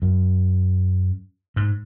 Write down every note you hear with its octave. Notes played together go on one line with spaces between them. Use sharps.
F#2
G#2